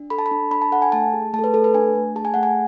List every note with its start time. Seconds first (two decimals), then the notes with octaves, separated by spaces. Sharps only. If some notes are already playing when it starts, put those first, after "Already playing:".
Already playing: D4
0.10 A4 B5
0.19 A5
0.26 B5
0.31 D4
0.51 D4 B5
0.62 A5
0.72 A4 F#5
0.82 G#5
0.92 A3 A5
1.13 G#4
1.33 A3 A5
1.39 A4
1.44 B4
1.54 A3 A4
1.64 B4
1.74 D4 G#5
1.95 A3
2.16 G#4 A5
2.25 G#5
2.34 A3 F#5
2.43 G#5